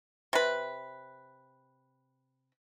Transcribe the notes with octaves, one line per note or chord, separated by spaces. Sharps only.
C3 B4